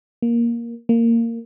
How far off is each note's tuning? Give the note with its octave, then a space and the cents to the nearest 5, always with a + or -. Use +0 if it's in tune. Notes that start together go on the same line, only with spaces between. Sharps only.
A#3 +10
A#3 -15